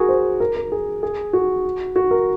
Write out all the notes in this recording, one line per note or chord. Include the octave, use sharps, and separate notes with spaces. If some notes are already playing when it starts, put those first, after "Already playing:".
Already playing: F#4 G#4 A#4
C5
A#4
A#4
G#4
G#4
F#4
F#4
A#4